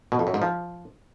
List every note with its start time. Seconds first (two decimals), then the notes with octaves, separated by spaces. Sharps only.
0.12 B2
0.19 F2
0.27 F#2
0.34 G#2
0.42 F3